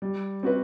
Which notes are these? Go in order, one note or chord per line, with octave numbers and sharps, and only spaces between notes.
G3
C4 F#4 B4